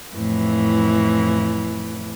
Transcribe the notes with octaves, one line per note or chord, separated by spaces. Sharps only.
F2 A2 E3